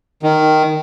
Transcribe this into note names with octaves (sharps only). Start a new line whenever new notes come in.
D#3